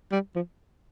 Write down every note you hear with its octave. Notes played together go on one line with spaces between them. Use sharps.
G3
F3